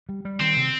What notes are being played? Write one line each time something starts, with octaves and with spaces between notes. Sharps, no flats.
G3
G3
D#3 C4
C3